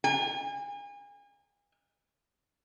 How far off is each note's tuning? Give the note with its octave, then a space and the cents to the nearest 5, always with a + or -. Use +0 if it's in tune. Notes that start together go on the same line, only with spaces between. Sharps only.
G#5 -35